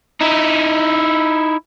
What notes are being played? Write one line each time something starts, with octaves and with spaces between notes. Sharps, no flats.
D#4 E4